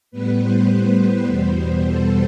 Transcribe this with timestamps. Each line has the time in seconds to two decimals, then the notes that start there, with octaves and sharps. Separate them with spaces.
0.11 A2 G3 B3 B4
0.40 C5
1.26 E2 B2 G3 B3
1.84 A4